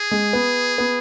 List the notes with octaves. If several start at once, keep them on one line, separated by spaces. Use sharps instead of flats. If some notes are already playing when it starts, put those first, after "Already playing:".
Already playing: G#4
G#3
B3
B3